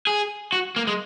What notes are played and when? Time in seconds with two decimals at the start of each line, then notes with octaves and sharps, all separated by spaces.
0.07 G#4
0.53 F#4
0.76 A#3
0.87 G#3